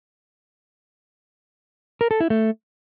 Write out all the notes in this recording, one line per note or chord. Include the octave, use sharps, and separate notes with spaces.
A#4
A4
E4
A3